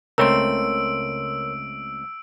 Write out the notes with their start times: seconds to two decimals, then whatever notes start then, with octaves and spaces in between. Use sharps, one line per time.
0.18 C#2 A3 C4 A#4 C#5 C6 E6 D7